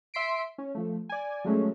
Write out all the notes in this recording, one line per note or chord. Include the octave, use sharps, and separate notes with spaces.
E5 C6 B6 C7 D7
C#4
F3 A3
D5 G#5
F#3 G#3 A3 C#4